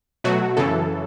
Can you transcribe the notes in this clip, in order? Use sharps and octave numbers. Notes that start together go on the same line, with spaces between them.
B2 F#3 A3 F#4
F#2 C#3 E3 A4